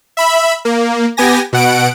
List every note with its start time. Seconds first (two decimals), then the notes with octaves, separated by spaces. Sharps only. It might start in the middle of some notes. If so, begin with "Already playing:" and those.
0.17 E5 B5
0.65 A#3
1.17 B3 G4 G#5 A#6
1.53 B2 F#5 D7